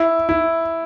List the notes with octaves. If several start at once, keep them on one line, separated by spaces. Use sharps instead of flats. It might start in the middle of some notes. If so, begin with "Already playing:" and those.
Already playing: E4
E4